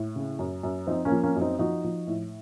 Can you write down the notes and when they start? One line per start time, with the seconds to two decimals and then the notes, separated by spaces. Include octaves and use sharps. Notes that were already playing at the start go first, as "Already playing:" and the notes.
Already playing: A2
0.16 C#3
0.39 F#2
0.63 F#2
0.87 F3 C4 D#4
1.05 A#3 C#4
1.12 F3
1.23 A#3 C#4
1.36 F#2
1.41 C4 D#4
1.59 F3 D#4 F#4
1.84 F3
2.07 A2